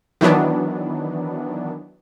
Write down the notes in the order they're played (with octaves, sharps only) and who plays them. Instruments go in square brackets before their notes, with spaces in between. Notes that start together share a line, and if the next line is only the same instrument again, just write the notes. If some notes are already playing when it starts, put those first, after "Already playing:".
[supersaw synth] D#3 E3 F#3 B3 D4